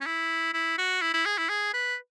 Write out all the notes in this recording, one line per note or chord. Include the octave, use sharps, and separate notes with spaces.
C#4
E4
E4
F#4
E4
E4
G#4
E4
G#4
B4